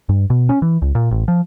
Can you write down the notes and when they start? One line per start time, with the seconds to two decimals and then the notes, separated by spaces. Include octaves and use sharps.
0.09 G2
0.30 B2
0.49 C#4
0.62 E3
0.82 C#2
0.95 A#2
1.11 A1
1.28 F3